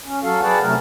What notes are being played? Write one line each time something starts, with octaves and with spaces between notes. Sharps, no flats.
C#4
F#3 F#4 A4 F5
G#4 B4 D5 F#5 G5 A5
C3 F#3 A3 A#4